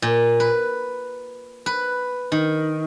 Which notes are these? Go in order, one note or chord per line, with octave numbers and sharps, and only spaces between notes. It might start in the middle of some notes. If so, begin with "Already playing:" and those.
A#2
B4
B4
D#3